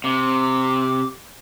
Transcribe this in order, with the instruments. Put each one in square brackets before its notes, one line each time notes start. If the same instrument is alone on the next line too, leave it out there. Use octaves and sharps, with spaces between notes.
[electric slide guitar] C3 [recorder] D6